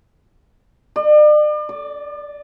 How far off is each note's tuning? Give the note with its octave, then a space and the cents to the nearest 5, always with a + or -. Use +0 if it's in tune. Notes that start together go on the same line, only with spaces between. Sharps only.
D5 +40
D5 -10